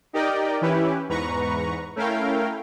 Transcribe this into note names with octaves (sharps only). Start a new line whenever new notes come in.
D#4 G4 A#4 D5 D#5 G5
E3 C#4 E4 G4 B4
E2 G#2 B4 A#5 C#6
A3 C#4 E4 A#4 F5 G5